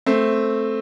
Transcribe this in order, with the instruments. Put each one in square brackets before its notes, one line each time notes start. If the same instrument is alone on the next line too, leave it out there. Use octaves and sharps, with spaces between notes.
[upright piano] A3 C4